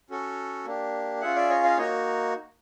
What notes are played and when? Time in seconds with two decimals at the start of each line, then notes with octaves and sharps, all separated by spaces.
0.10 C#4 F#4 A4
0.65 A#3 D4 G4
1.21 C#4 F4 G#4 E5 F#5
1.35 D5 E5
1.50 C#5 D#5
1.64 D#5 F5
1.77 A#3 D#4 F#4 C#5 D#5